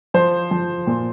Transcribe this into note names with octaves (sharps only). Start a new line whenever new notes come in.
F3 C5
F3
A#2